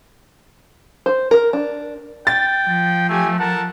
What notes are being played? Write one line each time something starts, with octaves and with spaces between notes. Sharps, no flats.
C5
A#4
D4
G5 A6
F3
A3 G4 G#5
A4 A#4 F#5 A5